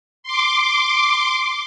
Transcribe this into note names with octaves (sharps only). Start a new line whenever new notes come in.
C6 D6